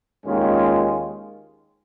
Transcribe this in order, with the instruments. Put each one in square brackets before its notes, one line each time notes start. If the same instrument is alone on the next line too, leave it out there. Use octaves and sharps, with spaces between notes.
[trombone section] D#2 D#3 G#3 C#4 F4